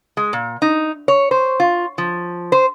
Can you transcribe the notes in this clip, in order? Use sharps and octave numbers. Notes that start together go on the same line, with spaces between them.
G#3
A#2
D#4
C#5
C5
F4
F3
C5